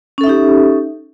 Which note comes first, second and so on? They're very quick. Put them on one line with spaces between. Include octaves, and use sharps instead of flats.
C#4 A4 E5 D#4 G4